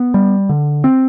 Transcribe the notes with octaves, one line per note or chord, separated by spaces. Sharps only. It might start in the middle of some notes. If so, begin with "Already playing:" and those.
Already playing: B3
G3
D3
C4